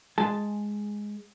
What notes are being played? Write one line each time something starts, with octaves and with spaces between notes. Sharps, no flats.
G#3 G#4 A5